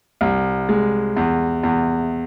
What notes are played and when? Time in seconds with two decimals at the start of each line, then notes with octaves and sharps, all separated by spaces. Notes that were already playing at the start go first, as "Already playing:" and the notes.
0.21 C2
0.69 G#3
1.16 E2
1.63 E2